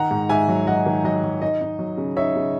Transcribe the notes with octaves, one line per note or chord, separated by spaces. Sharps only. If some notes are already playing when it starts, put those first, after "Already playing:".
Already playing: D#3 F#5 A#5
G#2
G#2 E5 G#5
F#3
F#3 D#5 F#5
D#3
F#3 D#5
F#3
D#4 D#5
D#4
F#3
C#3
D#4 C#5 E5
C#3